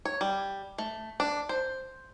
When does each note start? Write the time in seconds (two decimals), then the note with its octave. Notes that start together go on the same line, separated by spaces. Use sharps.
0.05 C#5
0.21 G3
0.78 A3
1.20 D4
1.49 C5